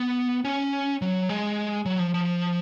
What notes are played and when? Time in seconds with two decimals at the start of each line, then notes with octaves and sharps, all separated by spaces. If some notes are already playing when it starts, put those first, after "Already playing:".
Already playing: B3
0.45 C#4
1.02 F#3
1.29 G#3
1.86 F#3
1.99 F3
2.14 F3